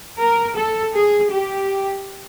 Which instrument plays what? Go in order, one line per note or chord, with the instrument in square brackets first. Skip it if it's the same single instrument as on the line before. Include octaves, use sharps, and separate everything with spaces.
[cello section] A#4
A4
G#4
G4